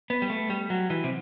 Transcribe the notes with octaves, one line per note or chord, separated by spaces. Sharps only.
B3
G3
A3
G3
F#3
E3
C3